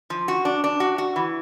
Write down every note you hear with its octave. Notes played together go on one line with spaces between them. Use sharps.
F3
F#4
D4
D4
F#4
F#4
E3